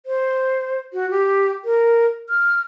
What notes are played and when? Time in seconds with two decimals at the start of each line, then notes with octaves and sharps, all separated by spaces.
0.06 C5
0.93 F#4
1.11 G4
1.65 A#4
2.29 F6